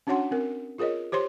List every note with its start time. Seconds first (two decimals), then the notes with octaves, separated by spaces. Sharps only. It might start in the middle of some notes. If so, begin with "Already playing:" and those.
0.07 C#4 D4 F#4 C#5 F#5 C6
0.31 C4 A#4
0.78 F4 G#4 A#4 C#5 D#5
1.12 G4 C5 C#5 C6